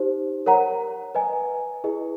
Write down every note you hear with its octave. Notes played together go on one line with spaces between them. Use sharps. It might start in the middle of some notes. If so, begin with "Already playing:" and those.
Already playing: D#4 G4 C5
A#4 C#5 F#5 A#5
B4 D#5 G#5
E4 G#4 B4 D#5